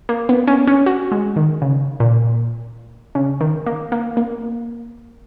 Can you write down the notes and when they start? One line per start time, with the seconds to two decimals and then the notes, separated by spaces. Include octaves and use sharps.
0.09 A#3
0.29 B3
0.47 C#4
0.67 C#4
0.86 F#4
1.11 G#3
1.36 D#3
1.62 C#3
2.00 A#2
3.15 C#3
3.41 D#3
3.66 A#3
3.92 A#3
4.17 A#3